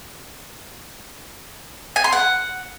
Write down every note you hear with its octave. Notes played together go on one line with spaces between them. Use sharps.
G#5
C6
F#5